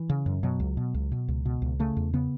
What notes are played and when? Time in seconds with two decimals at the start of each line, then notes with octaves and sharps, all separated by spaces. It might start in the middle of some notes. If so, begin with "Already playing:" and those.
Already playing: E3
0.09 C#3
0.26 F#2
0.43 B2 F#3
0.60 C#2
0.77 B2
0.94 C#2
1.12 B2
1.28 C#2
1.45 B2
1.62 C#2
1.79 C#3 A3
1.97 E2
2.13 C#3 B3